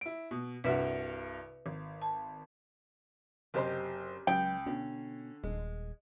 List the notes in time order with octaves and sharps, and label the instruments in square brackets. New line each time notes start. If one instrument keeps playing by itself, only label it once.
[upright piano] E4 D7
B2
[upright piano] C2 G2 F#4 [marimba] B4 E5
[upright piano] G#1
[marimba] A5
[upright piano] F#1 C5 C6 [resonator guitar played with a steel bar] C3 G4 D#5
[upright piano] C#2 [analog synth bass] F#3 [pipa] G5
[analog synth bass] B2 [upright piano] D3 [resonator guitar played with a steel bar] C#4
[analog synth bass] D#1 [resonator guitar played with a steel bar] G#3